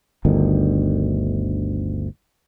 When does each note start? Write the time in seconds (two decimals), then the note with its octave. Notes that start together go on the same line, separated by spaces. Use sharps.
0.25 G1 D2 D#3